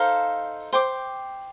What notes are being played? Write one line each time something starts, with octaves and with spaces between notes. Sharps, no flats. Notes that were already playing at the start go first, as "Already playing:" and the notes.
Already playing: D#4 A4 C5 F5
C5 G5 D6